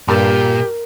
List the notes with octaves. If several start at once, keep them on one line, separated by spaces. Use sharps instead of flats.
G2 A#2 G4 A#4 A6